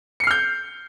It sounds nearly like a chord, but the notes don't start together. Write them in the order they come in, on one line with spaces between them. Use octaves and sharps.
C#7 C7 F6 G6